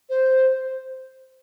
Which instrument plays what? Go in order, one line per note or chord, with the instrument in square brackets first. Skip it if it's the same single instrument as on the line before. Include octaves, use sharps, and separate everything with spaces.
[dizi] C5